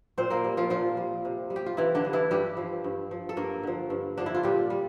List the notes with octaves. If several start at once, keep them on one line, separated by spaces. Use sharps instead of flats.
A#2 C4 C5
A#3 A#4
G3
F3 F4
A#2 F3 F4
G3
C3
G3
G4
F4
C3 E3 E4
D3 D4
G3
E3 E4
G2 G3 G4
F3
G2
F3
A4
G2 A#3 A#4
D3 F3
G2
D3 F3 D4
E4
F4
A#2 G3 G4
G3